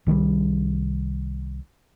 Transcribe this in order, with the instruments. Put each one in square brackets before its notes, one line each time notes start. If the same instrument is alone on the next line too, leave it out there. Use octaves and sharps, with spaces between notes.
[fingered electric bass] C2 D#3 F#3 G3